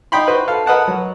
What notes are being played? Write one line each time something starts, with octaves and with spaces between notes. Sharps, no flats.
D#4 D#5 G5 B5 C6
F#4 B4 C5
A4 F5
A#4 B4 D#5 F#5 A5
F#3